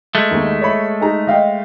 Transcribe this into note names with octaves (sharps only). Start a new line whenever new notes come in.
G#3 A3
D#2 A#3
C#5 E5 B5
D#4 G#4 A#5
D#5 F5 G5